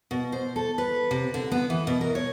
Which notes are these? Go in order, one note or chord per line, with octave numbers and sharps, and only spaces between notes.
B2
C5
A4
B4
C3
D3
B3
E3
B2
A#4
C#5